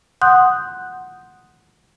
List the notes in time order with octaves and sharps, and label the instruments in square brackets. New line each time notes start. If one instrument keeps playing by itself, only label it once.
[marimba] F#5 C6 D#6 F#6 G6